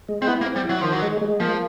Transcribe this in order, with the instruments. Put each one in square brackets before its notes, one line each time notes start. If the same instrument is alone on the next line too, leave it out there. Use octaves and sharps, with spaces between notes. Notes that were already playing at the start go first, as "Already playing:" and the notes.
[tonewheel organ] G#3
[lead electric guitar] C4
[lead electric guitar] B3 [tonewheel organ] E4
[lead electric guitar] A#3
[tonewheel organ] C4
[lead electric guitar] G3
[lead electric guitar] F#3 [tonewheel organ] E4
[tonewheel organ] D#3 [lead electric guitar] F3
[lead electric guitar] F#3
[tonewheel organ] G#3
G#3
[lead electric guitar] F3 [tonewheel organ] A#3